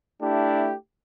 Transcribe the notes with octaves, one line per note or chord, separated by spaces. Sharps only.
A3 D4 E4 G4